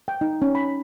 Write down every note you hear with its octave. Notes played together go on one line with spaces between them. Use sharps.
G5
D#4
C#4
B5